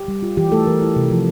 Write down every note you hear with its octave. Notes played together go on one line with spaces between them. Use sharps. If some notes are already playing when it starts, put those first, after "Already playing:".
Already playing: G4
G3
F4
E3 G4
A3 A4
E3 A#4
E4
C3
F3